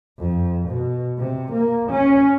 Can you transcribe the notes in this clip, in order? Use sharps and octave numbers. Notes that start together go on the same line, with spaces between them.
F2
B2
C3
A#3
C#4